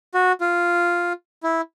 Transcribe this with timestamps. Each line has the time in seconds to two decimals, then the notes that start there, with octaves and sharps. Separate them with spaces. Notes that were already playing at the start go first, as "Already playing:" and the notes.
0.14 F#4
0.41 F4
1.43 E4